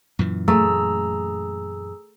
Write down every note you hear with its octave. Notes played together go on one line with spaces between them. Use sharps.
F#2 A#2 E3
A3 G#4 A#5 E6